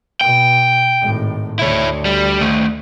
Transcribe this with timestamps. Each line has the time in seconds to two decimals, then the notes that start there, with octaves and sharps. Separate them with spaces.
0.21 B2 G5
1.01 G#1 A2
1.59 D2 E4 C#5
2.05 G3
2.41 D#3 A3